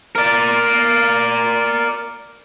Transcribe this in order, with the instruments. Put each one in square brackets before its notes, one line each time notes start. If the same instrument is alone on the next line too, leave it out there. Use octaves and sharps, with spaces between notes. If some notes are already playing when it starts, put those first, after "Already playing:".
[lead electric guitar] A#4 D5